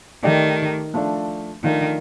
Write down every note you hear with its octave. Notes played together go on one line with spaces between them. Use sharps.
D#3 A3 D#4 G4 D5
F3 A3 D4
D#3 F3 A3 D4